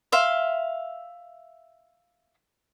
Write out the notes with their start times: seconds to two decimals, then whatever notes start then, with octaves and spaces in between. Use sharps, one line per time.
0.12 E5 F5 C6